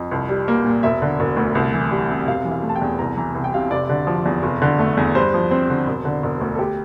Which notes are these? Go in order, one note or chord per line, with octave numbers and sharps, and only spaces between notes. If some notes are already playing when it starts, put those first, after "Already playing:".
Already playing: F2
C2
G3
A#3
A#2
E1 E5
D3
E1
D2
C2
E3
G3
C3
E1 F5
E3
F5
A3
A5
G5
E2
C2 A#5
E3 A#5
C2
G5
C3 F5
F1 D5
D3
F3
E2
F1
D3
A3
E2
G2 C5
F3
C4
D3
E1
D3
E1
D2
A4
G4